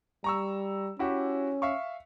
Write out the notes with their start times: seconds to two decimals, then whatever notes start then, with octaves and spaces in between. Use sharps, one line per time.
0.24 G3 A#5 C#6 E6
0.99 C#4 E4 F#4 G4
1.62 E5 F5 C#6